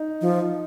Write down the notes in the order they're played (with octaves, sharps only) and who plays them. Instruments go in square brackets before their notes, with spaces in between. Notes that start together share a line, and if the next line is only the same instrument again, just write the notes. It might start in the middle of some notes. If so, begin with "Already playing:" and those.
Already playing: [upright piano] D#4
[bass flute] F3